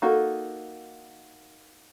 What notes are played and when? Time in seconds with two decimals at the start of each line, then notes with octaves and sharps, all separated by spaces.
0.02 A#3 D#4 F#4 A4